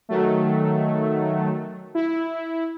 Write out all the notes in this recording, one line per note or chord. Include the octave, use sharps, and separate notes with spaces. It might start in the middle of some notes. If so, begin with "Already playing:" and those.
D#3 F#3 A3
E4